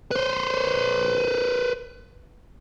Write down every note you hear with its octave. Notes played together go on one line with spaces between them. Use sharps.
B4 C5